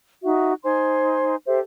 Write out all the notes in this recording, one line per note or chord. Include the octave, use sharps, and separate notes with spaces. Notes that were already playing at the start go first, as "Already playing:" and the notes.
D#4 F#4 E5
D#4 C5 G#5 C6
G4 A4 C5 E5